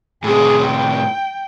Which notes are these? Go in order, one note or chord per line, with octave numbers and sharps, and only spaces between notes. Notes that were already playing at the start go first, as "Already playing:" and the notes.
A2 C3 G#4
G5